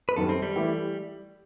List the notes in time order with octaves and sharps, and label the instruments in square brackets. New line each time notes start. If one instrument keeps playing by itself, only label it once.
[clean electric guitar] B4
[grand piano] F#2 D#3 G3 [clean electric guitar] A4
[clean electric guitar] C4
G3
[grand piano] E3 A3 E4 G4